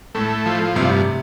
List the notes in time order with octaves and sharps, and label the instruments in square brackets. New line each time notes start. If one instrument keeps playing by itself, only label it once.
[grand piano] A2 [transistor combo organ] A3
[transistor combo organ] F3
[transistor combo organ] G2 [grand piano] C3